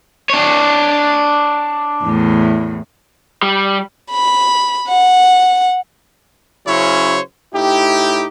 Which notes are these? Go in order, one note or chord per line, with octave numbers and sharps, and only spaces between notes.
D4 C#5
E2 A2
G3
B5
F#5
C#3 F#3 C#4 E4 C5 C#5
A2 D#4 E4 G4